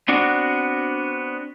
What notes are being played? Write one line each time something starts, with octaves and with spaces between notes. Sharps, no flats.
B3 C4 D4 F#4